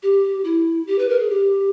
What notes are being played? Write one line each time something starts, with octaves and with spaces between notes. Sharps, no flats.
G4
E4
G4
B4
A#4
G#4
G4